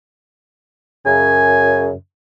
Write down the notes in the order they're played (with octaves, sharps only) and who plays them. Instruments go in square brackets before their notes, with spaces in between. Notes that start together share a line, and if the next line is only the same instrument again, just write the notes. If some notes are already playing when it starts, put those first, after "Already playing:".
[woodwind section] F#2 C#3 [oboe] G#5